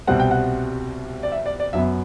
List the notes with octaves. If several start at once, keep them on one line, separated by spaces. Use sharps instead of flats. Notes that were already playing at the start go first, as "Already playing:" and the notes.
C2 B2 G3 C4 F#5
G5
F#5
D5
E5
D5
D5
F#2 F#3 B3 E5